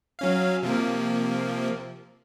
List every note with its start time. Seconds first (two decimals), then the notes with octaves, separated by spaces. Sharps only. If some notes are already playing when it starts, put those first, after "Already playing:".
0.19 F#3 C#4 F5
0.63 C3 F3 A#3